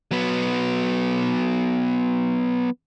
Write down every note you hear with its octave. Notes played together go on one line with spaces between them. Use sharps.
F#3 B3